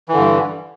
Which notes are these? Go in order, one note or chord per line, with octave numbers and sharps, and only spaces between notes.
G2 D3 E3